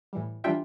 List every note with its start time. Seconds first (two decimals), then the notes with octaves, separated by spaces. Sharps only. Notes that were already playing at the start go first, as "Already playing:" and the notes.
0.13 A2 E3 G3
0.44 E3 G3 D4 F4 E5 G5